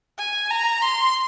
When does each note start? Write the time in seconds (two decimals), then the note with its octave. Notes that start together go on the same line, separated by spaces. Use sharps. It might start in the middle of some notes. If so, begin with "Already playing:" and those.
0.18 G#5
0.50 A#5
0.82 C6